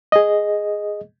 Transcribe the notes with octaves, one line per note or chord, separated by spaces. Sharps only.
G#4 D#5